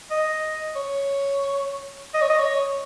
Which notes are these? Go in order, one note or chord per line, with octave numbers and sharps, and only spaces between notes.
D#5
C#5
D#5
C#5
D#5
C#5